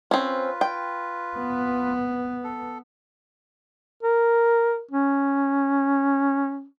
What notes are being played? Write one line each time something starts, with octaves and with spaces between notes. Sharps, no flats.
C4 C#4 F4 B4
G5
B3
A4
A#4
C#4